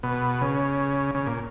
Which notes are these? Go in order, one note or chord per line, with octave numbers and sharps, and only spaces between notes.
B2
C#3
C#3
A#2